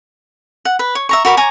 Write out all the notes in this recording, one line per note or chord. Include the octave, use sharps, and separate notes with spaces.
F#5
B4
C#5
E5 A#5 C#6
F#4 A#4 B5 D6
C#5 G#5 A#5 D6